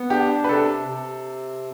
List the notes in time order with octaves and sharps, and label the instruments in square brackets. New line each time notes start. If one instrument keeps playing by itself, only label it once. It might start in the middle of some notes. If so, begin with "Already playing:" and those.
Already playing: [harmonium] B3
[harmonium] D4 [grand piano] G4
[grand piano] B4
[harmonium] C3 [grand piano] A4
[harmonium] C3